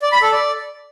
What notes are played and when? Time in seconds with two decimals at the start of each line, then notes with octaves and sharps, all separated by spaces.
0.02 D5
0.12 B5
0.22 A4
0.32 D5